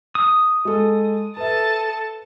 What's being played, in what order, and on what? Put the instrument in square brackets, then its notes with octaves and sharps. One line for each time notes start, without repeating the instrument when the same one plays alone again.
[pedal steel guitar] D#6
[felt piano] G#3 A4
[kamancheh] A4 A5 [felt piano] B4 E5